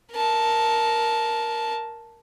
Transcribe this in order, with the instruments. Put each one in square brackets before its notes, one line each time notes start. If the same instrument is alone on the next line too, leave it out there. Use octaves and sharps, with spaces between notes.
[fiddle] A#4 A5